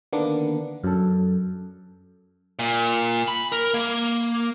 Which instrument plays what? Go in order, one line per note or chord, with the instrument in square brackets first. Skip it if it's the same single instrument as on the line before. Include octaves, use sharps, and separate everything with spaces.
[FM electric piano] D3 D#3 A#3 B3 D4
F#2 A4
[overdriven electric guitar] A#2
B5
A#4
A#3